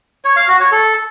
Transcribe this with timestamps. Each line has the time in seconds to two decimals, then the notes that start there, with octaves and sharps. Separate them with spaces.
0.25 C#5
0.36 F5
0.48 F#4
0.60 C#5
0.72 A4